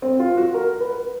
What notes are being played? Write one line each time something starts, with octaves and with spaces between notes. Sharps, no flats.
C4
F4
F#4
A#4
B4